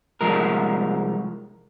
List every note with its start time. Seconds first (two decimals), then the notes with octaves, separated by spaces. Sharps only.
0.21 C2 F3 G#3 A#4